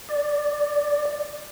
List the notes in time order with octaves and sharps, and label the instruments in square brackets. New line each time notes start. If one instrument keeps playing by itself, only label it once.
[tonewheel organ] D5